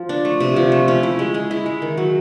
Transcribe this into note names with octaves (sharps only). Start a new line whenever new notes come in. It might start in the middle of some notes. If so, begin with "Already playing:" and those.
Already playing: F3
D4
A3
C3
F3
A3
C#4
E4
G#3
G#3
E4
G#3
D#3
F#3